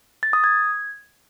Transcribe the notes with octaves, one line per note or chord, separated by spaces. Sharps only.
A6
D#6
G#6